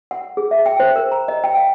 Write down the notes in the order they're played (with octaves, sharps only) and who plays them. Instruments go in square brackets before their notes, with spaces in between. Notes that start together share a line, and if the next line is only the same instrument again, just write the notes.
[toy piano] F#5
G#4
E5
G5
C5
A#4
A#5
D#5
G5
F5